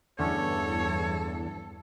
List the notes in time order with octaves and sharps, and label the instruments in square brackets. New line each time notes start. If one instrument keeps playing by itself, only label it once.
[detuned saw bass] E2 [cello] G2 A4 [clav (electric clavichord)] D3 A3 C#4 [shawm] C#5